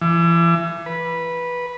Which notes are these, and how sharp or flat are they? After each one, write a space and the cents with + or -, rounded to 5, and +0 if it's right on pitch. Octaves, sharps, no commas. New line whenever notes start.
E3 +35
B4 -10